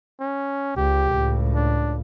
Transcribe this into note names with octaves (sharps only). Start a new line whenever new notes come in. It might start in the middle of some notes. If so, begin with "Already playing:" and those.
C#4
C#2 G4
C#2 A2
D4